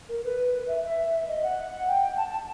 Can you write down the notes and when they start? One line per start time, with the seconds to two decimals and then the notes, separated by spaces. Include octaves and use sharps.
0.09 A#4
0.24 B4
0.68 E5
0.84 E5
1.28 D#5
1.43 F#5
1.88 G5
2.17 A5